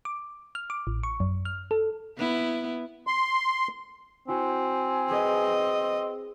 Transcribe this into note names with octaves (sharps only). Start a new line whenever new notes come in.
D6
F6
D6
A1
C#6
F#2
F6
A4
B3 E4
C6
C4 E4 F#4 C5 G#5
G#4 B4 D#5 D#6